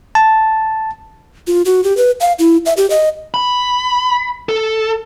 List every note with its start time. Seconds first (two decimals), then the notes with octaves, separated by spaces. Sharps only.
0.15 A5
1.47 F4
1.65 F#4
1.84 G4
1.97 B4
2.20 F5
2.39 E4
2.66 E5
2.77 G4
2.90 D#5
3.34 B5
4.49 A4